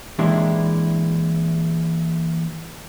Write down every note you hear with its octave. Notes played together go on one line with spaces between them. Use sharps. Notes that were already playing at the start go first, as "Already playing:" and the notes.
A#2 E3 G#3 D4 E4 G4